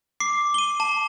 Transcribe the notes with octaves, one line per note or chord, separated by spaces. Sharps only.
D6 C7
D#7 G7
A5